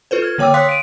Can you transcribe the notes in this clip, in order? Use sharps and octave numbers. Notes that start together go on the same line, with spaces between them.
F4 A4 B4 C5
F6 G#6
D3 A#3 C#5 G5 D6 E6
C#5 F5 C6 D#6 F#6 B6
D7 D#7